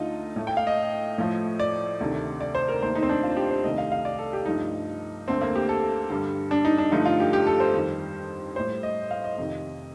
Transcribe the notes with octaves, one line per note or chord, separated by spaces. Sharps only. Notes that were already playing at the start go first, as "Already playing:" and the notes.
Already playing: D2 D3 A3 D#4 F4 D#5
A2 A3
G5
F5
D#5
A2 F3 A3
D5
D2 C3 D#3 A3
D5
C5
A#4
D#2 D#3 A3 C5
D#4
C4
D4
F4
G4
C5
C2 C3 D#3 A3 D#5
F5
F5
D5
A4
G4
G2 F3 A3 D#4
D2 D3 A3 C4
A#3
G4
A4
G2 D3 G3
D4
D#4
D4
G2 D3 F3 A3 D#4
F4
G4
G4
A4
C5
F2 D#3 G3
A2 G3 C5
D#5
F5
D#5
F2 C3 D#3